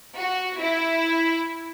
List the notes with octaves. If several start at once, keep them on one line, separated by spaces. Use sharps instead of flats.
F#4
E4